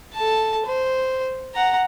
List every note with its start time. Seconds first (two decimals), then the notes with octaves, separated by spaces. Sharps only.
0.14 A4 A5
0.65 C5
1.54 F#5 A#5